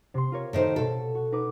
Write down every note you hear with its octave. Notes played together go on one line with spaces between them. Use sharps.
C3 C6
F4 A#4 C#5
A2 D#3 C5
B2 A4
F#4
D#4 B4 D6